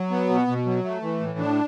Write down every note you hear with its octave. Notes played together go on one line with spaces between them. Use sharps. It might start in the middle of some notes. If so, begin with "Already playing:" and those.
Already playing: F#3
B3
B2
B2
F#3
A3
E3
A2
D4